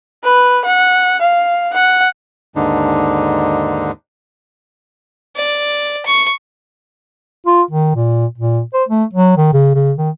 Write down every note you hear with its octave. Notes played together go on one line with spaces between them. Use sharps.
B4
F#5
F5
F#5
D#2 G#2 D3 D4 D#4
D5
C#6
F4
D#3
A#2
A#2
C5
A3
F#3
D#3
C#3
C#3
D#3